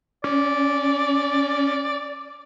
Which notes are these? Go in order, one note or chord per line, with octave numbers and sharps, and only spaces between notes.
C#4 D5